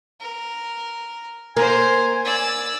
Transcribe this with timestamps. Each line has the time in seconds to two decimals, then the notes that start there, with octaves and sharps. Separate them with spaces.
0.20 A#4
1.57 A#3 A#4 C5 G#5
2.25 D5 E6